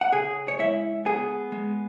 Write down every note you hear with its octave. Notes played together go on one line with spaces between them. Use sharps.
F#5
C#3 G#4 G#5
C#5
G#3 E4 E5
B3 G#4 G#5
G#3